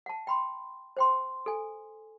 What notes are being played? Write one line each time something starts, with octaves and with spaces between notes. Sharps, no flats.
F#5 A5
G5 B5 C6
C5 G5 C6
A4 G#5